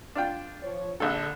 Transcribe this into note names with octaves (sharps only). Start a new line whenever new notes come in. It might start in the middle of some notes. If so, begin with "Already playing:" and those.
D4 F4 G5
F3 C#5
A#1 D3 A4